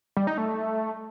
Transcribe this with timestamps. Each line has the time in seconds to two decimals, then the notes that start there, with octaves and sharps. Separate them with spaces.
0.17 G3
0.27 D#4
0.38 A3